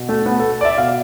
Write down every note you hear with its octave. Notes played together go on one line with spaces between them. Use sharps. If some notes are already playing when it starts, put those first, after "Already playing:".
Already playing: B2
A3
B3
A4
D5
E5
B2 F5